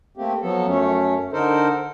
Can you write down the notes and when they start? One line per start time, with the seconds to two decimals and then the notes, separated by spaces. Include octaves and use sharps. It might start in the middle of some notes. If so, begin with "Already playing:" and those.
0.17 A3 A#3 C4 G4
0.41 F3 F#3 B3 A4
0.67 F#2 A3 C#4
1.33 D3 D#4 A4 A#4 C5